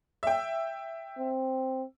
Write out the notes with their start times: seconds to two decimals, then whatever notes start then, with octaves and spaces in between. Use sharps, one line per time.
0.23 E5 G5
1.19 C4